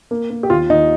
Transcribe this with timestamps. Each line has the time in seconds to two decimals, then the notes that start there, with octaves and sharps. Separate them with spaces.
0.11 A#3
0.30 A#3
0.43 G4
0.50 D#2 F4
0.69 D#2 D#4